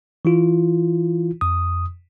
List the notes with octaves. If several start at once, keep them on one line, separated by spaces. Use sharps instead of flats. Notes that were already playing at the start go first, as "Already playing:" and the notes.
E3 E4 F4
F2 D#6